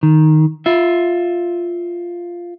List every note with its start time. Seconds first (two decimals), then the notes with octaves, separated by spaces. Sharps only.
0.03 D#3
0.66 F4 E5